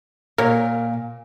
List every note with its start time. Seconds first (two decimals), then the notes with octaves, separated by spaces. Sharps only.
0.38 A#2 A#4 C#5